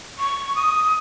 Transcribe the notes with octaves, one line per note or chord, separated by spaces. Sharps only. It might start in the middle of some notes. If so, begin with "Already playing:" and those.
C#6
D#6